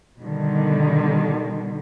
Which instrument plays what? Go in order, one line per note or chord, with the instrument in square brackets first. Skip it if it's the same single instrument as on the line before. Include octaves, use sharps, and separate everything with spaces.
[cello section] B2 D3 D#3 G3